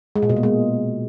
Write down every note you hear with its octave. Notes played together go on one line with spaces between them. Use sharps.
G#3
A#2
B2
A#3
G#3